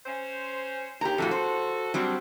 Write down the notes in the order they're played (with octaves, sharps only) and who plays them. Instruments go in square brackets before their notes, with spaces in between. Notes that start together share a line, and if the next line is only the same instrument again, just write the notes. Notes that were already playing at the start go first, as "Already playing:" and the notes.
[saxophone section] C#4 C5
[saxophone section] D#2 [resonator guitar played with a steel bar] G4 A#5
[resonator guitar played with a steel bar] F2 A2 F#3 [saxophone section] F#4 A4
[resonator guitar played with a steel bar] C5
[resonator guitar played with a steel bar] F#3 G3 C4 [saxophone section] D4